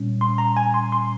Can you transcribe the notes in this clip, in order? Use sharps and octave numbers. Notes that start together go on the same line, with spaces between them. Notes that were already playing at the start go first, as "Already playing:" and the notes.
Already playing: A#2 G3 C#4
C6
A#5
G#5
C6
C6